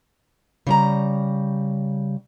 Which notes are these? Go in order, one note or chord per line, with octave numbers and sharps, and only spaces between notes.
C#3 G3 A#5